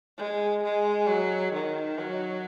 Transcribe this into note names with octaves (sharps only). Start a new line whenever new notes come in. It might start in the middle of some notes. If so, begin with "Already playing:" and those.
G#3
G#3
F#3
D#3
F#3